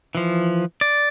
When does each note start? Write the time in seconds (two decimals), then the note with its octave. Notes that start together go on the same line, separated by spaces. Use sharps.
0.15 E3 F3
0.81 D5